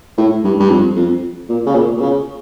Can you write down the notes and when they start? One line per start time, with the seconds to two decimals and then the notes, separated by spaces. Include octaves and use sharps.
0.18 A2
0.44 G2
0.59 G2
0.70 F2
0.96 F2
1.49 A#2
1.66 C#3
1.75 A#2
1.97 A#2
2.00 C#3